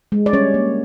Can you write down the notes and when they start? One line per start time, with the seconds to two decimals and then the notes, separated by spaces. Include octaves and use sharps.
0.12 G#3
0.26 D5
0.33 G3 C#4 C#5
0.54 A#3